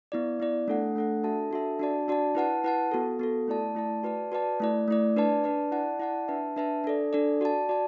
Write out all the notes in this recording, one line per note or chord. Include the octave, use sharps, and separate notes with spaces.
B3 E4 D5
B3 E4 D5
A3 D4 A4 F#5
A3 D4 A4 F#5
D4 F#4 A4 E5 A5
D4 F#4 A4 E5 A5
D4 F#4 D5 A5
D4 F#4 D5 A5
E4 B4 F#5 A5
E4 B4 F#5 A5
B3 F#4 A4
B3 F#4 A4
A3 E4 D5 A5
A3 E4 D5 A5
F#4 B4 D5 A5
F#4 B4 D5 A5
A3 E4 D5
A3 E4 D5
D4 B4 D5 A5
D4 B4 D5 A5
E4 D5 F#5 A5
E4 D5 F#5 A5
D4 B4 E5 A5
D4 B4 E5 A5
D4 A4 D5
D4 A4 D5
F#4 D5 A5
F#4 D5 A5